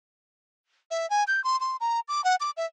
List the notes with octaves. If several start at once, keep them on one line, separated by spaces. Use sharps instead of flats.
E5
G#5
G6
C6
C6
A#5
D6
F#5
D6
E5